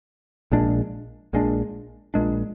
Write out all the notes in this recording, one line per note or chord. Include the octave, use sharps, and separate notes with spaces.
A#1 A#2 G#3 D4
A#1 A#2 G#3 D4
A#1 A#2 G#3 D4